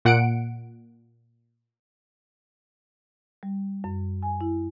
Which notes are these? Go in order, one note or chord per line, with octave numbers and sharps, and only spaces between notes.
A#2 F#5 C#7 D7
G3
F#2
G#5
E4